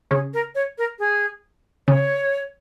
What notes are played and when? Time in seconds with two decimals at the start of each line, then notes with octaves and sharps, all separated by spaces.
0.11 C#3 C#4 G#4
0.34 A#4
0.55 C#5
0.78 A#4
0.99 G#4
1.88 C#3 C#4 C#5